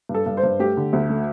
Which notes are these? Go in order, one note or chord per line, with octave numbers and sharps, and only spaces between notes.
G2
A4
G2
C5
G2
A3 G4
D3
D2
A3